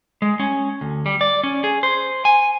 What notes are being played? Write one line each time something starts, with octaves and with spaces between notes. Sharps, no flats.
G#3
C#4
D2
G3
D5
C#4
G#4
C5
G#5